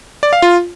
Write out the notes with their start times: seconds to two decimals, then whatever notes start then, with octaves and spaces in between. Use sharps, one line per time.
0.23 D5
0.33 F5
0.42 F4